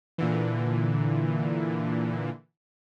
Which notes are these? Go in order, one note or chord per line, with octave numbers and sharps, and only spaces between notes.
A#2 D3 E3